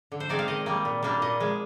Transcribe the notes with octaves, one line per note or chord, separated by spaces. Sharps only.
D3
C5
G#3 C4 D#4 D5
F5
D#3 D#5
G3 A#3
A#2
G3 A#3 D4
A#2 D#5
F3 G#3